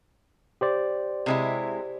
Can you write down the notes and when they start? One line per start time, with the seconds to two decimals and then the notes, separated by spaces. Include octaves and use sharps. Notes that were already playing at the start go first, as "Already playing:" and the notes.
0.61 G4 C5 D5
1.26 C3 G#3 E4